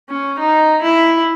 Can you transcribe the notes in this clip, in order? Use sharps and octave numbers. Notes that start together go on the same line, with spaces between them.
C#4
D#4
E4